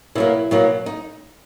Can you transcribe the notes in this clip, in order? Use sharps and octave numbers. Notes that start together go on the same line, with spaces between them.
B2 F#3 A#3 E4
B2 F#3 A#3
D#4